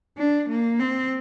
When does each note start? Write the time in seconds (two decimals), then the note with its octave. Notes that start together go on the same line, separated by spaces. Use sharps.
0.18 D4
0.50 A#3
0.80 C4